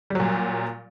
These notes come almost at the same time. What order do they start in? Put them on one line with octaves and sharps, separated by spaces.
G3 F#3 A#2